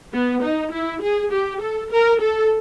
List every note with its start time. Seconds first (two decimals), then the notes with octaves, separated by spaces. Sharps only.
0.13 B3
0.42 D#4
0.72 E4
1.02 G#4
1.32 G4
1.62 A4
1.92 A#4
2.21 A4